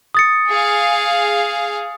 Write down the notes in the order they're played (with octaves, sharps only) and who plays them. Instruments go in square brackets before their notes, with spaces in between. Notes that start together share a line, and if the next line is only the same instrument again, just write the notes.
[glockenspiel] D#6 A6 C#7
[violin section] G#4 F5